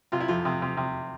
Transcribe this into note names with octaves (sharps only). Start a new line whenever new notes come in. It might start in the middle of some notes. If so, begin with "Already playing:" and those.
C3 F4
E4
F2 F4
C3
C3
C3